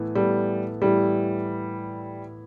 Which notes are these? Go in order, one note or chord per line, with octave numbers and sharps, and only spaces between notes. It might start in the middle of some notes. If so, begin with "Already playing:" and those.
Already playing: A2 E3 B3 E4 A4
A2 E3 G3 B3 E4 A4
A2 E3 G3 B3 E4 A4